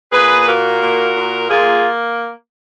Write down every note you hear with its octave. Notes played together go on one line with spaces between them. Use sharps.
A#2 G#4 B4
A#3 F#4 A#4
A#2
A#2
A#3 F4 G#4